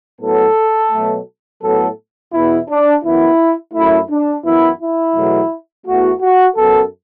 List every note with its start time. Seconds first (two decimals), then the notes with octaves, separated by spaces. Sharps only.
0.21 A2 F#3 B3 A4
0.91 B2 F#3 A3
1.62 A2 F#3 B3 A4
2.33 E2 B2 B3 E4
2.69 D4
3.04 F#2 E3 B3 E4
3.74 F#2 F#3 A3 E4
4.10 D4
4.45 F#2 E3 B3 E4
4.80 E4
5.15 E2 B2 F#3 A3
5.86 E2 E3 A3 F#4
6.22 F#4
6.57 F#2 F#3 B3 A4